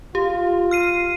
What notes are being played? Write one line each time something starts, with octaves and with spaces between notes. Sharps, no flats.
F4 G4
F6 C7 D#7